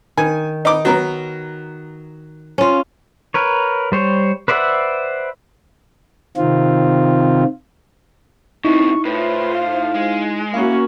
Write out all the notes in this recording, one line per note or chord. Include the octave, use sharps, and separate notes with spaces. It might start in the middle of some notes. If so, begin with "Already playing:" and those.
D#3 G#5
D#4 D6
F#3 B3 A#4
C#4 F4
A#4 B4 C#5
G3 C5 C#5
B4 C5 D5 E5 F#5
C3 D#3 C4 F4
A2 C3 D#4 E4 C#6
A2 F4 B4 C5
F5
G#3
A#3 C#4 E4 F#4 F5